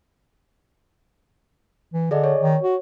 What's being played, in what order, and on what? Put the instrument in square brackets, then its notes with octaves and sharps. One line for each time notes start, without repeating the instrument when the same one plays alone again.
[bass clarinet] E3
[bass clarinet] D3 [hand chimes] G#4 D5 D#5
[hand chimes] C#5
[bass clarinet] D#3
F#4